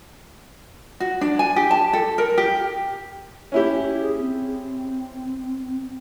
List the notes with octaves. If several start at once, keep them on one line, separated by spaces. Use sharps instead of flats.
F#4
D4
G#5
G4
A5
A4
A#4
G4
C#4 E4 G4
G#4
C4